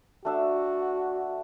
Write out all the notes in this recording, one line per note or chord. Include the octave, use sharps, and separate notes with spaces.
A3 D4 F#4 E6